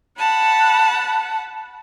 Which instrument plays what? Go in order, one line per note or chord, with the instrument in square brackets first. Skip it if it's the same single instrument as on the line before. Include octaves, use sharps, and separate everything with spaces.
[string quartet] F#5 A5 B5